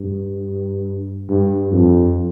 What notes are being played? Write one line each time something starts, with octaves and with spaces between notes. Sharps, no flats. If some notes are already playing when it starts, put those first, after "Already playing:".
Already playing: G2
G2
F2